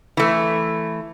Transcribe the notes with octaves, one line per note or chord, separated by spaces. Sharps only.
E3 A3